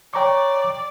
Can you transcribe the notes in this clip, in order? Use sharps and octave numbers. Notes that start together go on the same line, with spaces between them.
C#5 D5 G5 A#5 C#6 D6